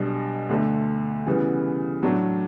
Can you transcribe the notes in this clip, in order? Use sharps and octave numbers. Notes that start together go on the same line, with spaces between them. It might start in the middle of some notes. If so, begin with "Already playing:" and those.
Already playing: B1 B2 G3 D4
D2 D3 A3
C#3 E3 G3 B3
A2 F#3 A3 D4 F#4